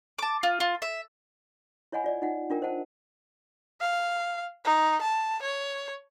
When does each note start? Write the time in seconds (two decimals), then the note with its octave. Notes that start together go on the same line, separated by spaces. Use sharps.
0.19 A5 D6
0.43 F4
0.60 F4
0.82 E5
1.92 E4 C#5 D#5 F#5 G#5 B5
2.04 F4 D5 D#5
2.22 D#4 F4 F#5
2.50 D4 F4 A#4 G5
2.62 C5 D#5 F#5 A5
3.80 F5
4.65 D#4
5.01 A5
5.42 C#5